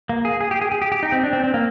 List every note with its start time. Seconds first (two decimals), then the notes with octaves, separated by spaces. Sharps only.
0.09 A#3
0.25 G#4
0.41 G#4
0.51 G4
0.61 G#4
0.72 G#4
0.82 G4
0.92 G4
1.03 D#4
1.12 C4
1.23 D4
1.33 C4
1.44 C4
1.54 A#3